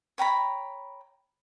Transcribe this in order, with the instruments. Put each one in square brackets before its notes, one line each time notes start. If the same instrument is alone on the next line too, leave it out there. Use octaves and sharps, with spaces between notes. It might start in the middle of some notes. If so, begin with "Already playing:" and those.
[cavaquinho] C#5 G5 A#5 B5